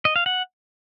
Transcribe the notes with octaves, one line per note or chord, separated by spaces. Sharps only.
D#5
F5
F#5